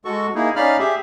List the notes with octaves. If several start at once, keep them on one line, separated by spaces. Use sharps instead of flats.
G#3 F#4 A4 C#6
A#3 D#4 E4 G#4
C#4 D#4 D5 F5 B5 F6
G4 G#4 E5